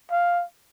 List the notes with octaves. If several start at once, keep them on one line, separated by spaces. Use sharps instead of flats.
F5